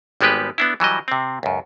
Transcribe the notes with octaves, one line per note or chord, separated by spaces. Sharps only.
G#1 G3 G#3 B3 G4 B4
B3 D4 E4
E3 F#3 G3 D#5
C3 C4
C#2 F#2